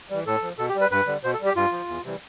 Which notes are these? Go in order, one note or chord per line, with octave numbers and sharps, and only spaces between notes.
E3 G3
A2 A4
F3
B2 A4
G4
G3
B4
G2 B4
D3 G3
B2 C5
A4
G3
G4
G2 F4
F3
E2
C3 E3 G3